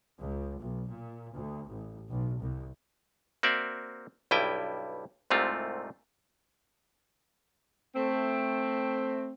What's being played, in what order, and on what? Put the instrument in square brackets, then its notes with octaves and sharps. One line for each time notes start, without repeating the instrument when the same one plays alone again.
[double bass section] C#2
B1
A#2
D2
A1
B1
C2
[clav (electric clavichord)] A#3 C4 F#4 D5 E5
B1 G2 G3 E4 G5 G#5
C2 G#2 C3 A3 C4 F4
[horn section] A3 C4